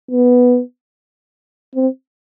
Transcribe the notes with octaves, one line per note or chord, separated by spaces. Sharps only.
B3
C4